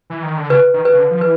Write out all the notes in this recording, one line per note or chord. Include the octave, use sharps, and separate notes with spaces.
E3
D#3
D3
C#3 B4
D#3
B4
C#3
D3
F3
E3 B4